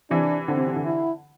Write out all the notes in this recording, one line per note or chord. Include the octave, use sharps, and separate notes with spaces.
C3 E3 D4
D3 C4
C3
C3
D3
E4